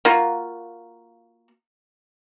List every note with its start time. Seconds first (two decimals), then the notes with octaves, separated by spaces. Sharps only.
0.05 A#3 F4 F#4